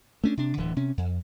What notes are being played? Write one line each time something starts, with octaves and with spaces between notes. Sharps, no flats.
A3 C#4 D4
C3 D4
D1 D3 E3
C3 C#4
F2